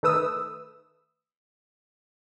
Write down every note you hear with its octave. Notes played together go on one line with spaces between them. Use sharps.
D#3 A3 B4 D#6 E6